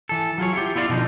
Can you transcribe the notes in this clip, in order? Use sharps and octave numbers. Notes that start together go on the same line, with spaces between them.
E3 A4
F#3 F4 G#4 C#5
E4 F4 G4
B3 E4 F4 D5 F5
B2 D3 F3 D#4